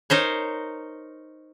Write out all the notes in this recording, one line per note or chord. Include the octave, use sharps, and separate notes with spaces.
D#4 A#4 C5 C#5